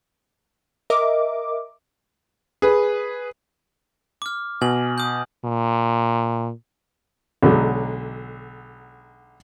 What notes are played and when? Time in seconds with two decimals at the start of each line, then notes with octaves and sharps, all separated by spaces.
0.90 A#4 D#5 E5 D6
2.62 G#4 B4
4.22 D6 F6
4.61 B2 G#5 F#7
4.98 D#6 G6
5.45 A#2
7.43 B1 D3 F#3 G#3